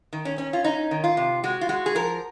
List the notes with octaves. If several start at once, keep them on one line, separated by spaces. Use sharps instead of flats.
D#3
C#4
C#4
F4
C#4 D#4
D#3
F4
C3
G#3 F#4
F4
G#3 F#4
G#4
F3 A#4